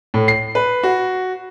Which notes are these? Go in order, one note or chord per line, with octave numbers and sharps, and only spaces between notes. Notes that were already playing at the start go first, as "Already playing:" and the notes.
A2
C7
B4
F#4